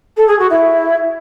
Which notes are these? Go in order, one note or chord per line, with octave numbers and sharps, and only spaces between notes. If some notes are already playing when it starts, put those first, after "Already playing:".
A4
G#4
F#4
E4